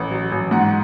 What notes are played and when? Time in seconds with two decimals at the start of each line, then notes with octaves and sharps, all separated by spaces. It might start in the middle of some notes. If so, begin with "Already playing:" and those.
Already playing: A1
0.11 F#3
0.32 A1
0.51 G#2 F#5